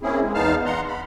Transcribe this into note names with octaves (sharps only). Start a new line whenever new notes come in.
A#3 C4 C#4 E4 G#4
G#3
E2 B3 D#4 F5 A5 F6
F#5 A#5 C6
B5